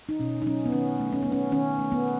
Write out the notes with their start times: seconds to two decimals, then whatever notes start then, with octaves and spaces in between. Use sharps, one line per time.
0.09 D#4
0.20 B2 C#4
0.42 D#4
0.46 F#3 C#4
0.66 B3
0.72 D#3 C#4
1.00 A3
1.13 C#4
1.22 A3 B3
1.32 C#4
1.52 D#3 C#4
1.79 A3
1.92 B3